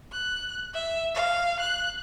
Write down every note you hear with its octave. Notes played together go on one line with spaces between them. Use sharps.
F#6
E5
F5
F#6